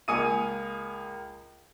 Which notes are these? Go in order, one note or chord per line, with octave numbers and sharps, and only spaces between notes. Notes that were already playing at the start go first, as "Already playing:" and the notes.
C#2 A#3 G#5 D#6 C#7 D#7